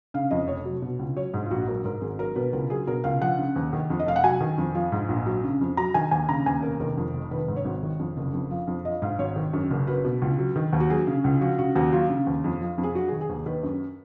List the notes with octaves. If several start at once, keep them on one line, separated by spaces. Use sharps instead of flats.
C#3 F5
F2 D#5
F1 C#5
F#3
B2
C#2
F#3 C#5
G#2 G#4
F4
A#1 F#4
F#3 A#4
G#2 A#4
G#1 G#4
F#3 A#4
B2 B4
C#2 A#4
F#3 G#4
B2 A#4
C#2 F5
F3 F#5
C#3
D#2
D#3
F2
D#5
F1 F5
F#5
F#3 G#5
D#3
F2
F3
G#2
A#1
F#3
C#3
F2
F#3 A#5
D#3 G#5
D#2 G#5
C#3 A#5
D#2 G#5
F1 A#4
D#3 A#4
F2
F1
D#3 B4
G#2
C#5
G#1
D#3
F2
F#1
F2
F3
F2
F3 D#5
G#2 F5
G#1 C#5
D#3
F#2
F#1
F#3 B4
B2
C#2
F#3
D#3
D#2
F#4
F#3 G#4
C#3
C#2
F3 F#4
C#3 F#4
D#2 F#4
F#3 F4
C#3
D#2
F2
F3
F2
G#4
F#3 F#4
D#3 G#4
G#4
D#2
D#3 B4
F#2